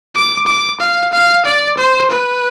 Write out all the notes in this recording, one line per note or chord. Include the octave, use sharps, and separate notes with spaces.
D6
D6
F5
F5
D5
C5
B4